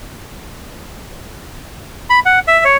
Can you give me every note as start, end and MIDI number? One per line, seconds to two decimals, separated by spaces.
2.10 2.20 83
2.26 2.39 78
2.48 2.64 76
2.65 2.77 73